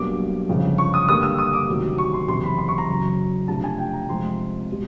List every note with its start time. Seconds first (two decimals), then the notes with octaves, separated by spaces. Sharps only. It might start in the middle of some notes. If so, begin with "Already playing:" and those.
Already playing: B1 B2 G3 A#3 D4 D6
0.49 G1 F2 C#3 F3
0.78 C#6
0.94 D#6
1.08 G2 D3 G3 A#3 D#6
1.23 E6
1.38 D#6
1.53 D6
1.68 D2 C3 D#3 F#3
1.98 C#6
2.13 C6
2.28 F#1 E2 C3 C6
2.43 B5
2.58 C6
2.68 C#6
2.78 A#5
2.88 F#1 F#2 C#3 F#3
3.48 F2 C3 F3 A3 D4 A5
3.64 G#5
3.78 G5
3.93 A#5
4.09 F2 C3 F3 G#3 C4 C6
4.70 B2 G3